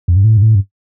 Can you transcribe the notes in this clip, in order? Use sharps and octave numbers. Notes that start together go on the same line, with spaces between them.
F2
G2
A2
G2
A2
G2